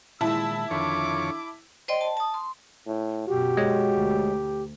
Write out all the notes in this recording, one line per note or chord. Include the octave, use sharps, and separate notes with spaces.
A#2 D#3 G#3 E4 A5 E6
F2 D3 D#3 C#5 D6
C5 D5 D#5 G5 C6
A5
A5 D#6
C6
A2
F#2 B2 F#4 G4
G#3 C#5
D2